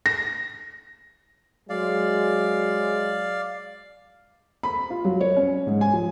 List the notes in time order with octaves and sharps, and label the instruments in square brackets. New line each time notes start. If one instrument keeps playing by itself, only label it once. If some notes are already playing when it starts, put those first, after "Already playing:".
[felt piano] A#6
[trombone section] F#3 G#3 [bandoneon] D5 F5
[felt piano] B5
F4
F#3
C#5
C#4
G#2
G#5
F3